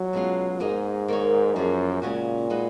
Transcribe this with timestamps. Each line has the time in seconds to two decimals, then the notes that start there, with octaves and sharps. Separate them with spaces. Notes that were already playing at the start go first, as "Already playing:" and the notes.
Already playing: F#3
0.13 B2 G#3 C#4 F4
0.60 G#2 A#3 D#4 G#4 D#5
1.08 D#3 A#3 D#4 A#4 C#5
1.56 F#2 F3 A#3 F4 G#4
2.02 A#2 C#3 G#3 C#4 F#4
2.50 G#3 D#4 F#4 B4